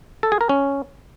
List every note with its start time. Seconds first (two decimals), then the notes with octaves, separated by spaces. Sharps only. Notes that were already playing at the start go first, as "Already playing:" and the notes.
0.23 A4
0.32 G#4
0.41 A#4
0.49 C#4